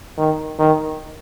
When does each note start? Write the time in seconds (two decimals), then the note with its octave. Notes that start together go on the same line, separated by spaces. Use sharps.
0.18 D#3
0.59 D#3